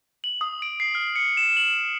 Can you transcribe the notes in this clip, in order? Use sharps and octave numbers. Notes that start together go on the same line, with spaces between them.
F#7
D#6
D7
C7
F6
C#7
E7
F#7